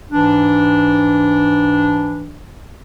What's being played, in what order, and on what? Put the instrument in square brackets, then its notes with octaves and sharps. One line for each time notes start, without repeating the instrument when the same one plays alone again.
[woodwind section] G#2 E3 D4